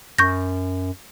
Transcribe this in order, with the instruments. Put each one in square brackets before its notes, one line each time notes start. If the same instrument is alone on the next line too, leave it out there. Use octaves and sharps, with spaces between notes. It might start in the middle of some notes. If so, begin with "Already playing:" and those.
[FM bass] F#2 [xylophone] C#6 G6 A#6